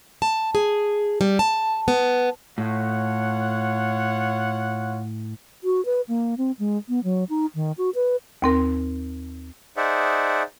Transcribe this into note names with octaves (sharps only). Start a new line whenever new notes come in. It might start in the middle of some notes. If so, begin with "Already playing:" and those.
A5
G#4
G3
A5
B3
A2 F4 C#5 F#5
F#4
B4
A#3
C4
G#3
B3
F#3
D#4
D#3
F#4
B4
D#2 C4 A#4
D#4 G#4 C5 D5 E5 F#5